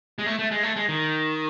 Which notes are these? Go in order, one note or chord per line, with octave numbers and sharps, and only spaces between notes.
G#3
A3
A3
G#3
A3
G#3
D#3